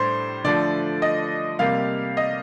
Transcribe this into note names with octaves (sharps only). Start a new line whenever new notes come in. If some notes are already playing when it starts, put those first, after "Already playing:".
Already playing: A2 G3 D4 C5
D3 F3 A3 D5
D#5
C3 G3 A#3 F5
D#5